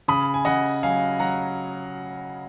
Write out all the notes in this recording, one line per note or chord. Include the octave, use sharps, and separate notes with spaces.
C#3 B5 D#6
G#5
C#3 D#5 F#5
F#3 F5 G#5
F#3 F#5 A#5